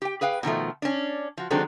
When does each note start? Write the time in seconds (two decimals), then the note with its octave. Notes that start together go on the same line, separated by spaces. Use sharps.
0.02 G4 G5
0.21 G#4 B4 F5 G5
0.43 B2 D#3 F3 A3
0.82 C#4 D4
1.37 F3 F#4
1.50 D#3 F#3 G#3 C4 D4 A4